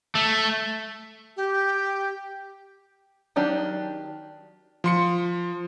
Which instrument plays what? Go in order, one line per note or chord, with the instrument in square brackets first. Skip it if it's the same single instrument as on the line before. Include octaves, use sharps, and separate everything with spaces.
[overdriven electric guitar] A3
[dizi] G4
[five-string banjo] D#3 F#3 D4 G4
[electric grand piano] F3 C6 C#7